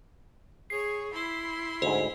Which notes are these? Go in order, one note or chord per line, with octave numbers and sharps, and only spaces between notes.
G#4 C#5 C7
E4 B5 C6
D2 G#2 C5